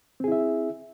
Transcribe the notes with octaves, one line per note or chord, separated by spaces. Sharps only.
C4 E4 G#4 E5